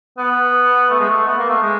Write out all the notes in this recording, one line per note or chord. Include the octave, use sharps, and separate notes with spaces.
B3
A3
G#3
A3
B3
A#3
A3
G#3